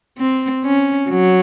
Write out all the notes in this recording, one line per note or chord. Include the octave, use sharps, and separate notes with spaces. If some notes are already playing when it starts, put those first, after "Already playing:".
C4
C#4
F#3